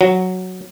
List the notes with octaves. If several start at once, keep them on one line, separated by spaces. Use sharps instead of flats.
F#3